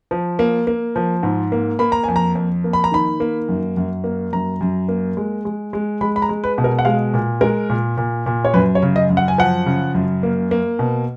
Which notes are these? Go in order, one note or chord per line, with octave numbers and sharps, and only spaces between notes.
F3
A#3
A#3
F3
G#2
A#3
A#3 B5
A#5
F2 G#5
A#5
F2
A#3
B5
A#5
D#3 B5
A#3
F#2
F#2
A#3
F#2 A#5
F#2
A#3
G#3
G#3
G#3
G#3 B5
B5
A#5
G#3
B4
B2
A#4
F#5
G#3 F5
A#2
G#3 A#4
A#2
A#2
A#2
C#5
F#2 B4
C#5
C#3
D#5
F#2
F#5
G#5
F3 F#5
C#3
F#2
A#3
A#3
B2